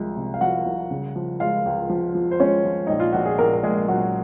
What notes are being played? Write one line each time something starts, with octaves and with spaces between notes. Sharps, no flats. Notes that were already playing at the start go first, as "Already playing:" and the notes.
Already playing: C2 F3 G#3
C3
F5
F3 F#4 F#5
C2
C#3
F3
G#3 F4 F5
C#2
F3
F3
C5
G#3 C#4 C#5
F3
A#1 D#4
F4
A#1 F#4
G#4
A#1 A#3 A#4
A#4
A#1 G#3 G#4
A#1 F#3 F#4